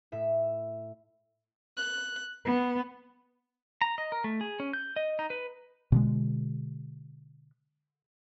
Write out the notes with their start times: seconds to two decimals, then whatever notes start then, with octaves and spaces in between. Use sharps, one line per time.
0.12 A2 E5
1.77 F#6
2.44 B3
3.81 A#5
3.98 D#5
4.12 A#4
4.24 A3
4.41 G#4
4.60 C#4
4.73 G6
4.96 D#5
5.19 D#4
5.30 B4
5.92 B2 D3 G#3